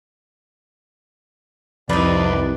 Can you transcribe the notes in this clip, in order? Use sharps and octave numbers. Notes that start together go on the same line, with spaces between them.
C2 F2 D#4 B4 D5